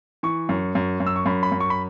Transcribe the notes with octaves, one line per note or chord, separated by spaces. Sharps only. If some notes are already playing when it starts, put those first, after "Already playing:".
E3 C#6
F#2
F#2
F#2
E6
C#6
F#2 B5
B5
F#2
C#6
B5